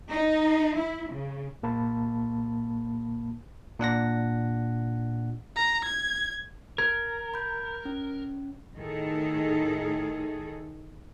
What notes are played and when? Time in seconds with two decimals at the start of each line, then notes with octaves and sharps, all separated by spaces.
0.10 D#4
0.76 E4
1.10 C#3
1.62 C2 A#2 A#3 A5 B5
3.79 A#2 D4 F#5 A#6
5.56 A#5
5.85 G#6
6.78 A#4 G#6
7.34 B5 G6
7.85 C#4
8.75 A2 D#3 G#4 A4